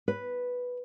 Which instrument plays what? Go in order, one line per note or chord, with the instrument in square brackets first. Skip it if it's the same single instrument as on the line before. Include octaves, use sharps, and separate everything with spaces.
[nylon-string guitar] B4